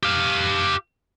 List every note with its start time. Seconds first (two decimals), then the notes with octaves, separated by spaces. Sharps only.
0.03 G4 F5